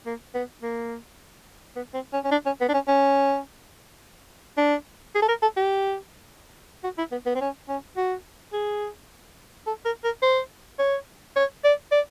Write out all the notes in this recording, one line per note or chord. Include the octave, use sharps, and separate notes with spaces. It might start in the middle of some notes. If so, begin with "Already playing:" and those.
A#3
B3
A#3
B3
C4
C#4
C#4
D4
C#4
B3
D4
C#4
C#4
D4
G#4
A4
A#4
A4
G4
F#4
E4
B3
B3
C4
C#4
C#4
F#4
G#4
A4
A#4
A#4
C5
C#5
C#5
D5
D5